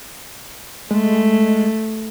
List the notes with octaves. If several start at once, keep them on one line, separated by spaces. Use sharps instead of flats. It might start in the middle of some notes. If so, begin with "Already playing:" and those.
G#3 A3